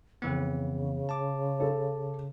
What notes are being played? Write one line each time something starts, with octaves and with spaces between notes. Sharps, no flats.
F2 C#3 E3 B3
A5 D6
A4